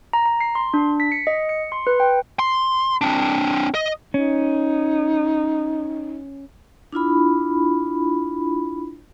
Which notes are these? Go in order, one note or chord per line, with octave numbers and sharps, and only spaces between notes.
A#5
A#5
C7
C6
D4
B6
C#7
D#5
C#7
C6
B4
G5
C6
C4 D4
D#5
C#4 D#4
D4 E4 F4 B5